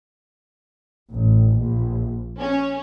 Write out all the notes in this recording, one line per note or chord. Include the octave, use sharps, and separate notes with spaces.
A1
A#1
C#4